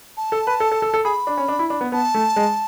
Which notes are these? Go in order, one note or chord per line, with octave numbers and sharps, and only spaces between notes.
A5
A4
B4
A4
A4
A4
A4
G#4 B5
D4
C#4
D4
E4
D4
B3
B3 A5
A3
G#3